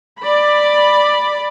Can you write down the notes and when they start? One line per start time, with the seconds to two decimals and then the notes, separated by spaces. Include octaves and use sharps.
0.19 D5 B5